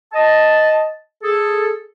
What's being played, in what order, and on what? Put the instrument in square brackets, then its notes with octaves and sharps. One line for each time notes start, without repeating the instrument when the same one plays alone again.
[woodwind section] D#5 A5
G#4 A4